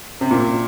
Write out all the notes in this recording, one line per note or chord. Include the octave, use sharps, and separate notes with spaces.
C3
A#2